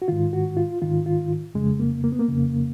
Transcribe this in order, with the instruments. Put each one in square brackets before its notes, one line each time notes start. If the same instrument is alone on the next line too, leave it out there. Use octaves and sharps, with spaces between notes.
[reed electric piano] F#4
G#2 D#3 F4
F#4
F4
G#2 D#3 F4
F4
F2 C#3 G#3
A#3
A#3
B3
A#3
F2 C#3